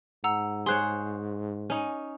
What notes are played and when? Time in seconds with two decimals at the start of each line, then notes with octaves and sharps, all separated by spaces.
0.24 G#2 F#5 A#5 E6
0.66 G#4 C5 C#5 C6 F#6
1.70 C#4 D#4